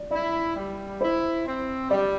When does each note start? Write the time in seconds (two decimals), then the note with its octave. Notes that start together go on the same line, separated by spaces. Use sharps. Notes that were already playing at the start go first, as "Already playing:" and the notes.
Already playing: D5
0.11 E4 D5
0.56 G3
1.01 E4 C5
1.45 C4
1.90 G3 D5